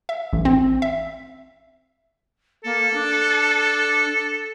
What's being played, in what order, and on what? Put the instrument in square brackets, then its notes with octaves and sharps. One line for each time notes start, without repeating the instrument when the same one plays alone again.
[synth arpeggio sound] E5
A1
C4
E5
[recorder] A#3 [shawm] A4
[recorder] D4